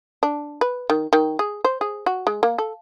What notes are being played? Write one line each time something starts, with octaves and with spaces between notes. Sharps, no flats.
D4
B4
D#3
D#3
G#4
C5
G#4
F#4
G#3
A#3
A4